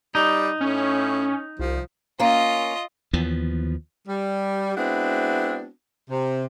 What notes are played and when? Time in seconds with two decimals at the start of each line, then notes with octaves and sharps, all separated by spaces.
0.15 G3 D#4
0.61 A2 C#4
1.59 C2 F3
2.20 A#3 C#4 F4 D#5
3.13 D#2 E3 F3 B3
4.08 G3
4.77 G#3 B3 C4 D4 E4 F#4
6.10 C3